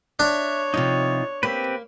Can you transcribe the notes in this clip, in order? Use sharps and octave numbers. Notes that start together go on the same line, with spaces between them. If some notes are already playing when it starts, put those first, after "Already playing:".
D4 C#5 E5
C3 F3 D#4 F4
A#3 C4 G4 B4